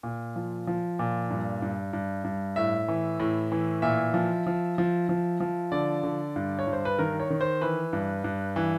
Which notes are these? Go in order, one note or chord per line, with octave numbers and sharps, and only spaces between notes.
A#2
F3
F3
A#2
G2
G2
G2
G2
A2 E5
E3
A2
E3
A#2 E5
F3
F3
F3
F3
F3
D3 D5
D3
G2
C#5
G2
C5
B4
D#3 A#4
C#5
D#3
C5
E3 B4
G2
G2
E3